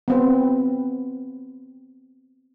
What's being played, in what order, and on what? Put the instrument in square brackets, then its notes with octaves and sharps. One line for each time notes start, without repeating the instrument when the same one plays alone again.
[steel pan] B3 C4 B4